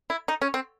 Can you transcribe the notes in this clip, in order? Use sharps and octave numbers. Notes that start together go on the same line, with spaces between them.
E4
D#4
C#4
C4